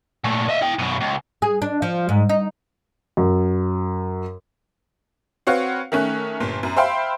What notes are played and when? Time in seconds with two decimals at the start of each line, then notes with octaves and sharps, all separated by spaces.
0.24 A#2 A3
0.49 D#5 E5
0.62 E4 G5
0.79 F#2 B2
1.00 C#2
1.42 G#4
1.62 D4
1.82 F3
2.09 G#2
2.29 D#4
3.17 F#2
5.47 C4 F#4 B4 C#5 F5 F#5
5.92 D#3 A3 C#4 F#6
6.40 G1 A#2
6.63 F#2
6.76 C5 E5 F5 G5 B5 C6